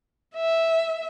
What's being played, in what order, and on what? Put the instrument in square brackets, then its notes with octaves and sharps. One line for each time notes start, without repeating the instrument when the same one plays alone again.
[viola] E5